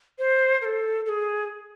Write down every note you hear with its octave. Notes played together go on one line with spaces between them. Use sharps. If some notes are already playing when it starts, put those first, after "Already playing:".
C5
A#4
A4
A4
G#4